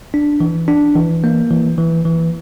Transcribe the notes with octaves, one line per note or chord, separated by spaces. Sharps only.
D4
E3
D4
E3
A#3
E3
E3
E3